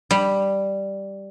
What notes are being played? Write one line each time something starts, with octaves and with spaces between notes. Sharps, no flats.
G3